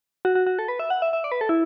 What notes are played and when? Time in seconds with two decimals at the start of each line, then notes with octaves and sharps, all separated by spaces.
0.25 F#4
0.35 F#4
0.47 F#4
0.59 A4
0.68 B4
0.79 E5
0.90 F#5
1.02 E5
1.13 E5
1.24 D5
1.32 B4
1.41 A4
1.49 E4